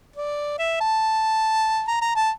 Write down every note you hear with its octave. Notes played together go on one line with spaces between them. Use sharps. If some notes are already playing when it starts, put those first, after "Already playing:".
D5
E5
A5
A#5
A#5
A5